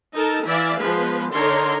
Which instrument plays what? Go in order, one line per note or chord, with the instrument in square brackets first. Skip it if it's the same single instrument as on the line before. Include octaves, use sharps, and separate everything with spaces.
[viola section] D#4 A4 A#4 A5
E3 E4 D5 E5 F5
F3 G#3 B3 B4
D3 D#4 A#4 C#5 A#5 C6